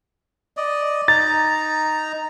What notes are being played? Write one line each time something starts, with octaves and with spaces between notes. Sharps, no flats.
D5 D#5
D#4 A#5 A6